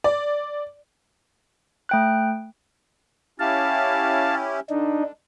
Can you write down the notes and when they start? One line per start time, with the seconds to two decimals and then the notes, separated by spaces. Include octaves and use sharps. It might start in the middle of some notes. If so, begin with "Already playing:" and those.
0.04 D5
1.89 A3 G5 F#6
3.40 C#4 E4 G4 F5 A5
4.70 D3 D4 D#4